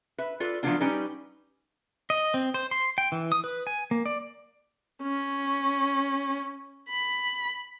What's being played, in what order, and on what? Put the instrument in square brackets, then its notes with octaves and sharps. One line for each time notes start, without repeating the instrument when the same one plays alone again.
[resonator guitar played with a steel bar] B4 E5
F4 A4 B4 D5
F3 F#3 A3 B3 D4 F4
G3 C#4 D#4 B4 D5
[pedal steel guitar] D#5
C4
C5
C6
G5
E3
D#6
B4
G#5
A#3
D5
[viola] C#4
B5